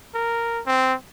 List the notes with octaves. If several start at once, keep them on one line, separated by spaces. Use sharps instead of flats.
A#4
C4